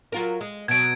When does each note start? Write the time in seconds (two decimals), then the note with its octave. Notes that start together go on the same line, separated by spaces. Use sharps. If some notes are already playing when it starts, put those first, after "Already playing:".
0.12 F#3 F4 A#4
0.41 G#3
0.68 B2 F#3 G#6 D7